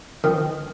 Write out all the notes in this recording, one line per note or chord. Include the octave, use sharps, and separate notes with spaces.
D#3